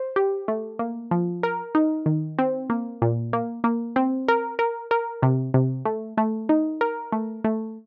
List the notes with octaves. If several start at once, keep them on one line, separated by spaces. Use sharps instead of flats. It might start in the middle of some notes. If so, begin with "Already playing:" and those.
Already playing: C5
G4
A3
A#3
F3
A#4
D#4
D#3
C4
A#3
A#2
A#3
A#3
C4
A#4
A#4
A#4
C3
C3
A3
A3
D#4
A#4
A3
A3